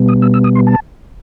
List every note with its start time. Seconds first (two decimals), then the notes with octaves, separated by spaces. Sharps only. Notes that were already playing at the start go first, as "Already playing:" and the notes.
Already playing: B2 G3 B3
0.08 D#6
0.22 E6
0.34 E6
0.44 D#6
0.55 C6
0.67 A5